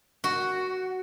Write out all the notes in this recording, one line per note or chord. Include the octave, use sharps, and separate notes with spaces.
F#4